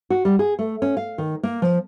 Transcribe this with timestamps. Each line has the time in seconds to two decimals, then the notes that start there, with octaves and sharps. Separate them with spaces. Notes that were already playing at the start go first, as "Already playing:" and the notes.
0.10 F#4
0.25 G3
0.39 G#4
0.59 A3
0.82 C#4
0.97 F5
1.18 D#3
1.43 A#3
1.62 F3